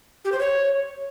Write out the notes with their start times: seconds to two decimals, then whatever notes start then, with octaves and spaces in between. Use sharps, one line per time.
0.25 G4
0.32 C5
0.39 C#5